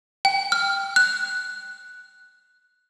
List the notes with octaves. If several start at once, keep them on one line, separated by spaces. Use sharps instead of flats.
G5
F6
F#6